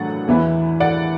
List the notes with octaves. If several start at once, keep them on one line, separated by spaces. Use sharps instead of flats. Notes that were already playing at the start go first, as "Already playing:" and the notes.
Already playing: A2 F#3 D4 F#5 A6
E2 E3 B3 E4
D5 F#5